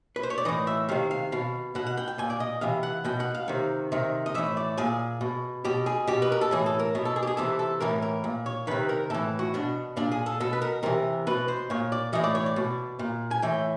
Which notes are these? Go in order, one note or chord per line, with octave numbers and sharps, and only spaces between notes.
B4
C5
C#5
D5
A2 E3 D#5
E5
C3 D#3 F5
F5
B2 F5
B2 F#5
F#5
G5
G5
A#2 G#5
D5
D#5
C3 E3 F5
F#5
B2 G5
F#5
F5
C3 D#3
C3 D#3
D#5
A2 E3 E5
D5
A#2 G#4
B2
B2 G4
G#4
B2 G4
B4
A#4
A4
A2 E3 G#4
A4
A#4
B2
A4
G#4
G4
G#4
C3 E3 A4
A4
A2 E3 A#4
A#4
A#2
C#5
C3 D#3 B4
A#4
A2 E3 A4
F#4
B2 D4
A#2 D4
G#4
A4
B2 A4
B4
A#4
C3 E3 A#4
B2 B4
C5
A#2 C#5
D5
A2 E3 D#5
D5
C#5
D5
B2
A#2
G#5
A2 E3 G5